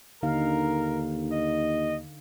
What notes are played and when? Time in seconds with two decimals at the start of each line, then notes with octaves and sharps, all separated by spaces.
0.23 D#2 D3 D#4 A#4 F5
1.32 D#5